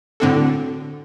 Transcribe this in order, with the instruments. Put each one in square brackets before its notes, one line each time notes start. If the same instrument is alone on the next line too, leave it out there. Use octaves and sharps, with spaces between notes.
[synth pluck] A2 D3 C4 D4 F#4 A4